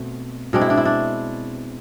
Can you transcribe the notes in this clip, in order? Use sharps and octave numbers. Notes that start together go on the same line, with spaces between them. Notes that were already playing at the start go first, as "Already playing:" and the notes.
Already playing: B2 A3 C4
B2 G#3 C4 D4
E4
D4
E4
D4